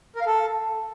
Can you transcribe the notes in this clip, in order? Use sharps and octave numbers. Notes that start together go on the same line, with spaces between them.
A#4
F5
A4